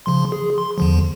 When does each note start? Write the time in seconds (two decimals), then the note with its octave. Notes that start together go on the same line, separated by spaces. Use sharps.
0.06 C#3 F3 C6
0.32 G#4
0.58 C6
0.78 E2 D3 F3